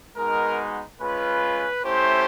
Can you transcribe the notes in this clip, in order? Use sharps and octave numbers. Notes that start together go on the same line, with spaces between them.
G#3 B3 D#4 F#4 A#4
G#3 C#4 F4 B4
A3 C#4 E4 G4 C5